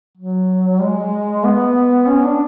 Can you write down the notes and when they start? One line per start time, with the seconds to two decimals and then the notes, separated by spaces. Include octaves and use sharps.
0.18 F#3
0.82 G#3
1.45 B3
2.08 C#4
2.25 D4